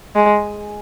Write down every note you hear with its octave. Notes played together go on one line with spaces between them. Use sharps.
G#3